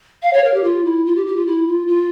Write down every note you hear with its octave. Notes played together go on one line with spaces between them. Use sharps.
F5
C#5
A#4
G4
F4
E4
F4
G4
G4
F4
E4
F4
F4